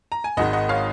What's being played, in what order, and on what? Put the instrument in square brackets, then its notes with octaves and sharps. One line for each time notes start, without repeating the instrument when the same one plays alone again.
[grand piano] A#5
G#5
G#1 G#2 D#3 D#5 F#5
D#5 F#5
C#5 F5